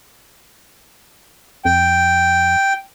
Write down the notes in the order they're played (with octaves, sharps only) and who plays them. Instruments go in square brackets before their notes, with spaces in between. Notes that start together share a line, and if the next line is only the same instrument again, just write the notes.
[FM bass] F2 [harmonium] G5